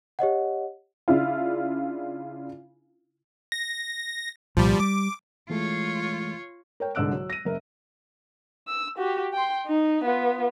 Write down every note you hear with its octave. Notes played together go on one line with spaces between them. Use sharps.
G4 C#5 D#5 F#5
C#3 D4 E4 F4
A#6
C2 A#2 F3 G3
G3 D6
E3 G#3 A3 F4 C#5
A#4 C#5 G5
C2 G#2 D3 E6 F#6 D7
F#3
A#6 D#7
F#1 A#4 E5
E6
F#4 G4
G5 C6
D#4
B3 F4